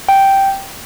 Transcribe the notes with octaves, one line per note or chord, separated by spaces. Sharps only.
G5